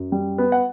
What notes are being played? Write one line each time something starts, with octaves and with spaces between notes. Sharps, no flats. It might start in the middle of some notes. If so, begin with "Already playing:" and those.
Already playing: F#2
G3
B3
F#5